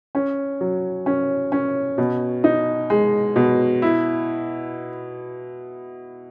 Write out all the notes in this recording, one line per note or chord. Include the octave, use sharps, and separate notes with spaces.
C#4
F#3
C#4
C#4
B2
D#4
G#3
B2
E4